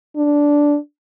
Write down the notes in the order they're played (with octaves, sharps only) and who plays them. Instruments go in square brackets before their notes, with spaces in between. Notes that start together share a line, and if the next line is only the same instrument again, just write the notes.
[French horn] D4